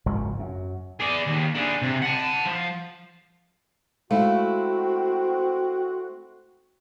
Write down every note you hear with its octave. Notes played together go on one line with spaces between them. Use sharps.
F#1 G#2 C#3 F3
F#2
G#4 D5
D#2
D4 G#4
C3
F#5 A5
F3
G#3 A3 C4 E4 F#4 F5